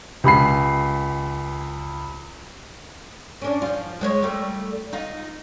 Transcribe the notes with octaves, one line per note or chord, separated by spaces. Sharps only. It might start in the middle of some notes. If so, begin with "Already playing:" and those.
C#2 G4 B5 C7
C#4 D4
F3 F4
G#3 C5 C#5
G3 A3
D#4 F4